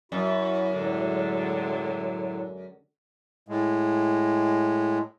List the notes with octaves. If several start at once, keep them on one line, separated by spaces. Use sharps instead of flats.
F#2 E4 F#4
A2 D3 F#3 G#3
A2 G#3